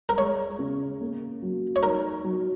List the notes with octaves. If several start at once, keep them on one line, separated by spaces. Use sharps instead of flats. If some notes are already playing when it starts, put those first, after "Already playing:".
A#4
G#3 C#5
C#3
A#3
F#3
C#5
D#4 A#4
F#3